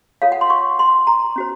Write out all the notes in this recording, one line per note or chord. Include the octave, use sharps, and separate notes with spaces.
F4 A4 C#5 F5
F#5
C6
C#6
C6
A#5
C#4 F#4 C5